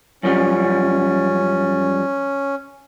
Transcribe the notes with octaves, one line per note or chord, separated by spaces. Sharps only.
F#2 F3 G3 C#4